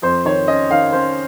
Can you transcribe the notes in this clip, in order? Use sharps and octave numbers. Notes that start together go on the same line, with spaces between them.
F2 C5
D#3 C#5
C#4 D#5
D#3 F5
C#4 C5